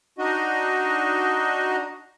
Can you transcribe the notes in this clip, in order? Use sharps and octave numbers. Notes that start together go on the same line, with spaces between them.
D4 D#4 F#4 D#5